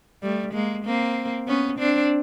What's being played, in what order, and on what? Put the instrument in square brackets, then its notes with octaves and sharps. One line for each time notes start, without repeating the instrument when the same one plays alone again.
[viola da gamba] G3 A3
G#3 A#3
A#3 C4
B3 C#4
C4 D4